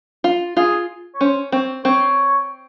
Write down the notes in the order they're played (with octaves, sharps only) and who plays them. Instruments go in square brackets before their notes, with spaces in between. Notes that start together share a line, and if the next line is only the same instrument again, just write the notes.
[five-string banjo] F4
[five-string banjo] F4 [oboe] G#4
[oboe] C#5
[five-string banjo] C#4 [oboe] C5
[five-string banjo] C4 [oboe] C#5
[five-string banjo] C4 [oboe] C#5